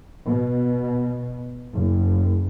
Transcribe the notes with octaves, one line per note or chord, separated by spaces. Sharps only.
B2
F#1